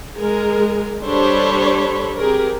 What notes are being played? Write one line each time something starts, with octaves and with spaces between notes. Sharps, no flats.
G#3 G#4 A#4
G3 D4 A4 C5 C#5 B5
C4 G4 G#4 A#4